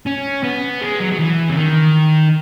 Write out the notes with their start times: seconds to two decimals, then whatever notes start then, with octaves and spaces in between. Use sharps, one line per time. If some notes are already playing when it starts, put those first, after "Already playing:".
0.06 C#4
0.44 B3
0.81 G#3
1.00 F#3
1.12 F#3
1.19 E3
1.50 C#3
1.57 D#3